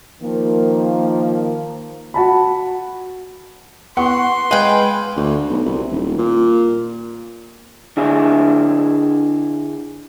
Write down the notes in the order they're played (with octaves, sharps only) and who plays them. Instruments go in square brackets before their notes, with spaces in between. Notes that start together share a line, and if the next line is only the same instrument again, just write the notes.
[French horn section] D#3 F3 A#3
[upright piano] F#4 A5 B5
[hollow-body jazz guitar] B3 [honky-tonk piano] F#5 C#6 [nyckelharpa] C6
[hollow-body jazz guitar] G#3 D#5 [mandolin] B4 G5 [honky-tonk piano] F5 G#5
[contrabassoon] D2
B1
C2
D#1
A#2
[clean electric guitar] D3 D4 E4 G#4 E5